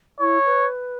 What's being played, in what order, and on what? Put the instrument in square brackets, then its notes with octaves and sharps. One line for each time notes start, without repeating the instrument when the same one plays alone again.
[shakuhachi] E4 [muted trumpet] C#5
[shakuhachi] B4